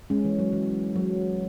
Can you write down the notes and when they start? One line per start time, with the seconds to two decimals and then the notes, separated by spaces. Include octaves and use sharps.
0.10 G#3 C#4
0.25 E3
0.39 F#3
0.53 E3
0.96 F#3